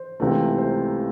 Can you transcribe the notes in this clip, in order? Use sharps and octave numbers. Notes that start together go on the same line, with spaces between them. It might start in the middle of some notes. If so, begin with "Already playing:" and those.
Already playing: C5
C#2 C3 E3 A3
C5